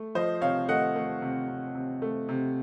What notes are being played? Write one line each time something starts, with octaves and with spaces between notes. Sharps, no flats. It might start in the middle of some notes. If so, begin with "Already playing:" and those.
Already playing: A3
F3 C5 D#5
C3 C#5 F5
A3 D#5 F#5
A3
C3
C3
C3
A3
C3